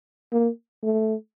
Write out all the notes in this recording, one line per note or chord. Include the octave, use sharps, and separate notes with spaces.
A#3
A3